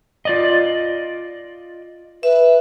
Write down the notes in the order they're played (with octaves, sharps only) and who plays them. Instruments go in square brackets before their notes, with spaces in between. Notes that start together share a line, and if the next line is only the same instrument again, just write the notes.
[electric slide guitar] F4 D5 D#5
[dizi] B4 [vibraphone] E5